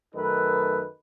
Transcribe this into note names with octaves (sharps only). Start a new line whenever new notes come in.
F#2 D#3 A3 D#4 A4 B4